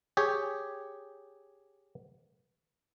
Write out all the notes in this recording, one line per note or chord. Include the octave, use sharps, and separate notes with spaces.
G4 G#4 C#5